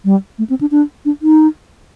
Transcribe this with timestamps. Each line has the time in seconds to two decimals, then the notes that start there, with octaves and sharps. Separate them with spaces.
0.05 G3
0.38 A3
0.50 C4
0.61 D4
0.71 D4
1.05 D4
1.22 D#4